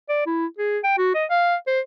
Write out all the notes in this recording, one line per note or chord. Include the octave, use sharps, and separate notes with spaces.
D5
E4
G#4
G5
F#4
D#5
F5
C5